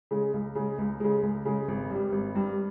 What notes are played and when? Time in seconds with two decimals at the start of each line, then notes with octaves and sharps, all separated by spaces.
0.11 C#3 G#3
0.33 C#2
0.55 C#3 G#3
0.78 C#2
1.00 C#3 G#3
1.23 C#2
1.45 C#3 G#3
1.68 G#1
1.90 G2 G3
2.12 G#1
2.35 G2 G3